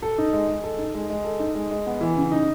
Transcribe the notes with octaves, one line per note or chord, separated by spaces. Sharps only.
A4
D#4
G#3
G#3
A4
D#4
G#3
G#3
A4
D#4
G#3
G#3
B3
E3
C#3
D#4